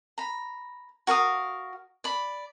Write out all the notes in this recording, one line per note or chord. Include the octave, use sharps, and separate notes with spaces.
A#5 B5
F#4 A#4 F5 D#6
D5 B5